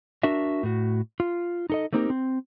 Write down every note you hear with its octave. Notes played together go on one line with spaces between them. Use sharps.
D4 F#4 A#4 E5
A2 F#4
F4
D#4 A4 D#5
A3 A#3 C4 D#4 G4 A#4
C4